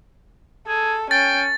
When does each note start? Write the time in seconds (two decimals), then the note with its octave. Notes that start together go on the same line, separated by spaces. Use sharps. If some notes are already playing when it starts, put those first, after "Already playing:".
0.68 G#4 A4
1.11 C#4 G5 A6